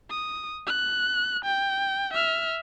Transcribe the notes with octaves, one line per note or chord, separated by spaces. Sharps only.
D#6
F#6
G5
E5 F6